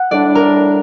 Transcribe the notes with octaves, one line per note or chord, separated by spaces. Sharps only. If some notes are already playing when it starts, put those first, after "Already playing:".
Already playing: F#5
A2 G3 D4 D5
A#4